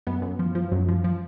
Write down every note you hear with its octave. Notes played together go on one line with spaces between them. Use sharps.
F#2 B3
F#2
F3
F3
F#2
F3
F3